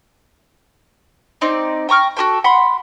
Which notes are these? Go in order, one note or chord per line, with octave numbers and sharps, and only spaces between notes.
C4 D#4 D5
G5 A#5 C#6 F6
F#4 G4 A4 G5
F#5 B5 C6